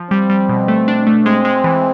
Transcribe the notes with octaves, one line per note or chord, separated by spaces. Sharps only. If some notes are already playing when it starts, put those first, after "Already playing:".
Already playing: F3
G3 C4
G3
B2
A3
D4
A3
G#3 C4
G#3
E3